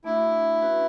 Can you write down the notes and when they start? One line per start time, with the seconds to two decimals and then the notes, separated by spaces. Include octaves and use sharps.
0.04 A3 D4 E4 F#4
0.62 C#4 F#4 B4